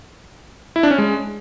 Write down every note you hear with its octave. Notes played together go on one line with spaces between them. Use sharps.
E4
D4
C#4
G#3